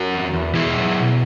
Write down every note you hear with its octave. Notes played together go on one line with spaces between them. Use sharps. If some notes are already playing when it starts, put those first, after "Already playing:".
Already playing: F#4 A#4
E2
E2
B2 E4 G#4
F#3
B2